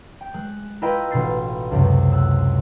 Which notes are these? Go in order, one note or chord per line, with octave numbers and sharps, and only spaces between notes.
G5
G#3 F#6
E4 F4 A#4 B4 D#5 G5
A1 B2 D4 C6 A6 C7
C#2 F#2 C3
E6 F#6